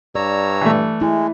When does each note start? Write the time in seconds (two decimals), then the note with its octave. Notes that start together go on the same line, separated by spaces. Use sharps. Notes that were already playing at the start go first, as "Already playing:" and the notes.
0.15 G2 C#5 D5 A#5 E6
0.61 E3 A3
1.01 G#3 E4